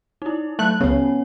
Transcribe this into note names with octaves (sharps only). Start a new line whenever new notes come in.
D#4 E4
F#3 A3 A5 F#6
C#2 C#3 B3 C#4 C#5